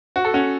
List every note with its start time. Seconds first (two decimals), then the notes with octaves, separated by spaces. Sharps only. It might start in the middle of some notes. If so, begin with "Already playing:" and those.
0.16 F#4
0.25 A4
0.34 C#4 F#4